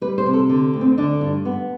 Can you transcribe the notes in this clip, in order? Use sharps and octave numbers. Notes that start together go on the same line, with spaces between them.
G3 B4
C5
C3
A4
D3
D2
C4
D3 D4
G2
B3